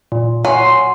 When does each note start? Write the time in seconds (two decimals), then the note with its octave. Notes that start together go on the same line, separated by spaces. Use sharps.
0.12 A#2
0.45 F#3 G#5 C6